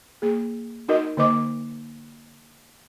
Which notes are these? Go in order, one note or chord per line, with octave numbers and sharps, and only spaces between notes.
A#3 G#4
D#4 F#4 A#4 D#5
D3 A#3 C5 D#5 D6